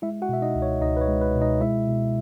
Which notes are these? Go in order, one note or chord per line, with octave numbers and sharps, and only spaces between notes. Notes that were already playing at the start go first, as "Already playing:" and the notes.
G#3 E4 E5
F#4 F#5
B2 E5
D#4 D#5
C#2
C#5
C#2 D#4 D#5
B4
C#5
G#3
B4
B2
D#4 D#5
G#3 E4 E5
B2